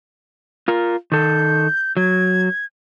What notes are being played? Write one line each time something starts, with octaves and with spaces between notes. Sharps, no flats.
F4 A#4
D#3 A4 G6
F#3 G#6